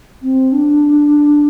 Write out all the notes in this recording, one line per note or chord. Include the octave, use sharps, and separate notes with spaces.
C4
D4